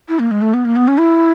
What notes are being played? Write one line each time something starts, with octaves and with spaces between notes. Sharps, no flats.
E4
A#3
G#3
A3
B3
A#3
B3
C#4
E4